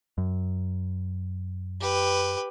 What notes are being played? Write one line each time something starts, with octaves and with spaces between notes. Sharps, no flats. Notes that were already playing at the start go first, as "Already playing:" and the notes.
F#2
G4 B4